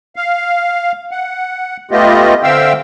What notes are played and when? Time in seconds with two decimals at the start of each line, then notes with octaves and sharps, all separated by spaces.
0.16 F5
1.11 F#5
1.91 A3 B3 F4 G4 D#5
2.43 D3 C4 E5 F5 G5 E6